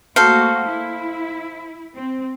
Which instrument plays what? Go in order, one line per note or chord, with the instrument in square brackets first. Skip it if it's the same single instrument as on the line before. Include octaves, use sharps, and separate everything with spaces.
[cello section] A3 A#3 F#4 [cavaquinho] A4 C5 F5
[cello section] E4
C4